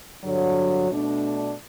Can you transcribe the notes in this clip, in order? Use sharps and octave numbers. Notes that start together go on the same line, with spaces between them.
G2 D3 F#3
B2 A3 D4